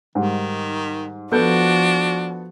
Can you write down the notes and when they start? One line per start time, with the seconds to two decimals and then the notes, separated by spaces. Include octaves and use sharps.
0.15 G#2 D#3 G3
1.32 F3 B3 D4 F#4 A4 G6